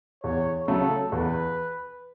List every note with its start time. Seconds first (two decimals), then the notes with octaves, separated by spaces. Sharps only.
0.24 E2 C#5
0.67 C#3 F#3 A3 A4
1.12 E2 B4